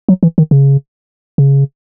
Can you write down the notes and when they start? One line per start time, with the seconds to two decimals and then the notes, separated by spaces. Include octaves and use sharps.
0.09 F#3
0.23 E3
0.38 D#3
0.51 C#3
1.38 C#3